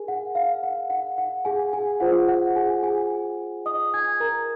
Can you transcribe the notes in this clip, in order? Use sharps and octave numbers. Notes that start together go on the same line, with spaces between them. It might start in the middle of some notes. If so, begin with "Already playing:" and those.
Already playing: G#4 A#4 G#5
F#5
F5
F#5
F#5
F#5
G#4 G#5
G#4 G#5
F4 G#4 C5 F#5
F#5
G#4 G#5
G#4 G#5
D#5 D#6
G#5 G#6
A#4 A#5